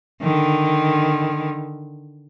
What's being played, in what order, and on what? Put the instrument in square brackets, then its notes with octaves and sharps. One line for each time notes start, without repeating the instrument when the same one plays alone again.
[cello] D3 D#3